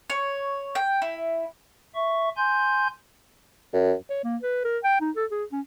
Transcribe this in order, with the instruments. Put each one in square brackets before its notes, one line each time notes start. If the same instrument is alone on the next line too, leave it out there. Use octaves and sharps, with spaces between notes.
[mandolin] C#5
G5
E4
[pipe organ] E5 C#6
G#5 C6 G6
[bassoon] F#2
[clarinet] C#5
A#3
B4
A#4
G5
D#4
A4
G#4
C#4